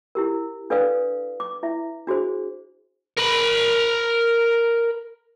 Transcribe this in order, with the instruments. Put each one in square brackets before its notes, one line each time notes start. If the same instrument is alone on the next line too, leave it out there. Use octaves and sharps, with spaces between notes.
[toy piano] E4 G4 A#4
D4 A4 B4 D5 F5 D#6
D6
E4 E5
D4 F#4 G#4 C5
[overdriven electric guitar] A#4 B5